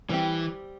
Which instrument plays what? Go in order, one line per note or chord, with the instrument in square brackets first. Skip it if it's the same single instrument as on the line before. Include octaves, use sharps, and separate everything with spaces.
[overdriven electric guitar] E3 [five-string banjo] G3 C4 G4